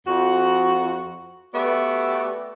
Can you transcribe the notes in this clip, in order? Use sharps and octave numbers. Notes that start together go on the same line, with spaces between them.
F2 F#4
A3 B3 F#4 G4 D5 E5